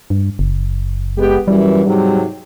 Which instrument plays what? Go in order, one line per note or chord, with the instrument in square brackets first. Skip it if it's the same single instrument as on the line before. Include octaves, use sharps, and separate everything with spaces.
[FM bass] G2
F#1
[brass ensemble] G#3 B3 G4
[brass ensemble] F#2 E3 [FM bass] G3
[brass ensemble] G#2 C3 F#3